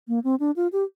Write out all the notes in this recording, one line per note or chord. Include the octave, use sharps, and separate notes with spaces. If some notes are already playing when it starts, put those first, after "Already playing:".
A#3
C4
D4
F4
G4